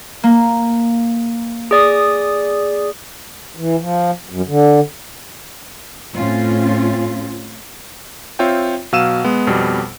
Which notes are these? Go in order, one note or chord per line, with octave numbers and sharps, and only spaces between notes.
A#3
G#4 D5 D#6
E3
F3
F#2
D3
A2 C4 C#4 F4
C4 F4 C#5 E5 G5
B2 F#3 F5 E6 D#7 E7
G#3 B3
F2 B2 G3